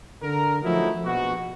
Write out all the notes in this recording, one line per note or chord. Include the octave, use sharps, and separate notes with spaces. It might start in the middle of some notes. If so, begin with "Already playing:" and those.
D3 A#4
F3 F#3 A3 D#4 E4
A#1 B2 F#4